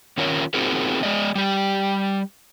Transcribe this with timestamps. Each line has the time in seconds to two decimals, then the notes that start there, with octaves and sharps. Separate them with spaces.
0.18 D#3 C#4 F4 A#4 C#5
0.54 C4 D#4 F4 F#4 G#4 A#4
1.03 G#3 D5 D#5
1.35 G3 G4